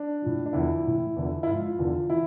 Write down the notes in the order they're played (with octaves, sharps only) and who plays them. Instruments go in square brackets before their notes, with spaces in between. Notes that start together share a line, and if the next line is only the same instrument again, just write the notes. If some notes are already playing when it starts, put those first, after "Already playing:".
Already playing: [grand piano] D4
A2 F3
D4
E2 D3 F3 E4
A2 E3
E2 D3 F3
E4
G#2 F3 F4
E2 D3 F3
E3 E4